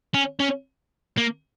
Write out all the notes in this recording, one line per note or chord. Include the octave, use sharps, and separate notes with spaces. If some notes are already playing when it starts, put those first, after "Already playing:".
C#4
C#4
A#3